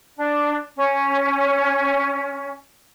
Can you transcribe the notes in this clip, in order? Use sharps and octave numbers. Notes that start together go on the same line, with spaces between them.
D4
C#4